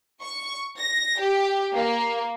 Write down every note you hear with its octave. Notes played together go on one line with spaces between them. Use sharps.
C#6
A#6
G4
A#3